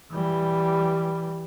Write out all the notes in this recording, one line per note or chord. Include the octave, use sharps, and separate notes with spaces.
E3 G3